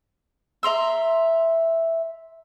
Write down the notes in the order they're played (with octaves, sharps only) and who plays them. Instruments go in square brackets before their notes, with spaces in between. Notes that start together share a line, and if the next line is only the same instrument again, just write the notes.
[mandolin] E5 A#5 C6 E6